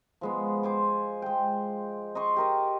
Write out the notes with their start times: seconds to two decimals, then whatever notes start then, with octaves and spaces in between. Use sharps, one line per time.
0.21 F3 G#3 B3
0.63 C5 G#5 D6
1.22 G#3 G5
2.15 D#5 C6 C#6
2.36 G4 A#4 D#5